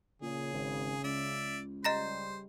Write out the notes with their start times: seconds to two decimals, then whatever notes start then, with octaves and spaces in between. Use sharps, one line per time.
0.22 A#2 C#3 G#4
0.53 G#1
1.04 C#2 D5 E5
1.84 C#3 G3 C5 D#5 A#5 A#6